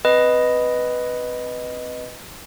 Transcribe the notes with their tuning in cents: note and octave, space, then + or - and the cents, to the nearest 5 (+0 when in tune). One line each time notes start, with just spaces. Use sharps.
C4 +0 B4 +0 D#5 +0